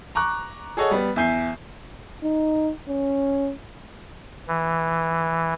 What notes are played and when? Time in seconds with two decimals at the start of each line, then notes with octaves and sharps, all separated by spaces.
0.15 A#5 C#6 D6 F#6
0.77 G#4 A4 C#5 D#5 F#5
0.91 G3 B3
1.16 E2 E5 G#5 G6 C7
2.23 D#4
2.89 C#4
4.48 E3